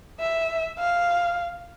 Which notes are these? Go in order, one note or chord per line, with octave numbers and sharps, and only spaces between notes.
E5
F5